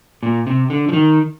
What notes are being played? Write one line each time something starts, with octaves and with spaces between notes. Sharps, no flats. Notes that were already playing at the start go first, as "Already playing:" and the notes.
A#2
C3
D3
F3
D#3